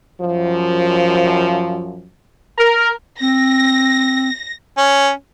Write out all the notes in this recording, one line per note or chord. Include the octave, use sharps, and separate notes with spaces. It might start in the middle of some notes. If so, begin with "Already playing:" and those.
F#2 F3
A#4
C4 A#6
C#4